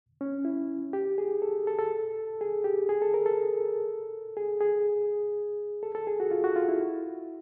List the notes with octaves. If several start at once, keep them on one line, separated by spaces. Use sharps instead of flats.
C#4
E4
G4
G#4
A4
A4
A4
G#4
G4
G#4
A4
A#4
A4
G#4
G#4
A4
A4
G#4
F#4
F4
F#4
F4
E4